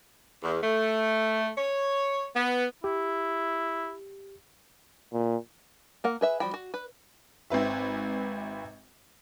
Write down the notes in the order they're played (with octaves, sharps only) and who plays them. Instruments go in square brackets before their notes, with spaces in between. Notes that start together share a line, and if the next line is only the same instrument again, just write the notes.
[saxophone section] E2
A3
C#5
B3
[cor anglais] E4 [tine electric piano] G4
[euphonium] A#2
[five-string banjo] A#3 A#4 F#5
G#4 B4 E5
F3 G3 F#4 G5 B5
F#4
B4
[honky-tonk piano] G#1 C4 B4 E5